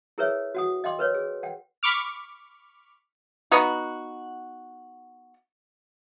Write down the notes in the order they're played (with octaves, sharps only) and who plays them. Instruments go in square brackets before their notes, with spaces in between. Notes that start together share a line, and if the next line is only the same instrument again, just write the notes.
[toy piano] E4 G#4 A#4 B4 C#5 E5
F#4 F#5 D#6
D#5 F5 G5 C6 D6
A#4 B4 C#5
G#4
F#5 G5
[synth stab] B5 C#6 D6 F6
[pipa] B3 D#4 F#4